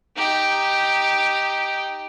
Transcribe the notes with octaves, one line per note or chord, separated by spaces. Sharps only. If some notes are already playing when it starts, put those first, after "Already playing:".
D#4 G4